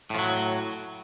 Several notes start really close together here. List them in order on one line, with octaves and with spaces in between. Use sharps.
A2 F3 F#3